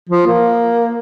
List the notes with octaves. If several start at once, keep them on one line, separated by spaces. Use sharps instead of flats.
F3
A#3